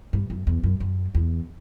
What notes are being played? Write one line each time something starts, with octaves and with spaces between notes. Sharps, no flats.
G2
F#2
E2
F#2
F#2
E2